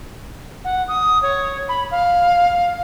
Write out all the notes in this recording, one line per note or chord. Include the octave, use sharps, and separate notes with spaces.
F#5
D#6
C#5
B5
F5